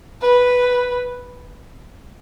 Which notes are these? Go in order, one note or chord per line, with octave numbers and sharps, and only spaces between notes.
B4